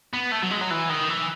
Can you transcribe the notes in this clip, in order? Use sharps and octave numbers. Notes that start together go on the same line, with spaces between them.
B3
A3
F#3
G#3
F#3
E3
D#3
E3